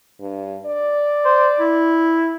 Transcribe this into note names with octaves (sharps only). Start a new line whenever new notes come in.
G2
D5
C5
E4